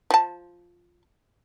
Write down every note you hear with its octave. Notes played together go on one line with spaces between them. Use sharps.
F3 A5